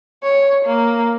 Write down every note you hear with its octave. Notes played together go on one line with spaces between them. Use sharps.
C#5
A#3